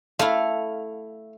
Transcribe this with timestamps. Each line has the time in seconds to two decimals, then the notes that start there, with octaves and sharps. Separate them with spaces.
0.19 A3 E4 F5